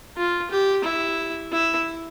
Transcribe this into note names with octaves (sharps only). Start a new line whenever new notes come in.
F4
G4
E4
E4